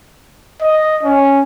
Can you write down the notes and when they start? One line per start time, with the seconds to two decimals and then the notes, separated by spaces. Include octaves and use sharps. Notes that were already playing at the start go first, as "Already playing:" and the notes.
0.62 D#5
1.03 C#4